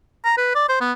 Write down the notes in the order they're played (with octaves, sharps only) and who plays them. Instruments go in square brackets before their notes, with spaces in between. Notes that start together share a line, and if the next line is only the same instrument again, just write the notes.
[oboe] A#5
B4
D5
C5
B3